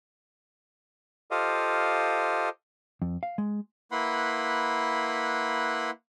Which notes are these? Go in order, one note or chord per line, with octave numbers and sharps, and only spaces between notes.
F4 G4 A4 C5 D#5 F5
F2
F5
G#3
A#3 E4 B4 F#5 B5 C6